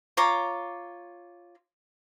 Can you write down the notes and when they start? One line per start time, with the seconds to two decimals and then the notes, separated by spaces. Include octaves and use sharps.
0.17 F4 C#5 A#5 D6